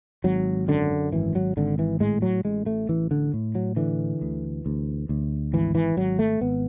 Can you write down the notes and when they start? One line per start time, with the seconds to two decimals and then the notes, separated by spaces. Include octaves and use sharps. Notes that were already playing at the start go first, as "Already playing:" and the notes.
0.24 G#1 F#3
0.68 F#2 D3
1.12 G#1 E3
1.35 F#3
1.57 G#1 D3
1.79 E3
2.00 A2 G#3
2.22 F#3
2.45 A1 G#3
2.66 A3
2.89 A1 E3
3.11 D3
3.33 A2
3.55 F#3
3.77 D3 E3
4.22 D2
4.66 D2
5.09 D2
5.53 G#1 E3
5.75 E3
5.97 G#1 F#3
6.19 A3
6.41 G#1 B3